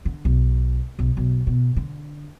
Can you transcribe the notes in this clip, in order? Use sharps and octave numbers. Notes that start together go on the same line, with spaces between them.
D3
B1
B1
B1
B2
D3